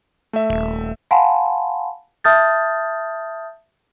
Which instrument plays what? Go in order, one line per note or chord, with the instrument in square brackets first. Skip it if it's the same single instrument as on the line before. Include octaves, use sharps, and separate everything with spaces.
[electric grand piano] A3 E5
[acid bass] D#1
[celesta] F5 F#5 G#5 A5 B5 C6
E5 A5 D#6 F6 G6 A6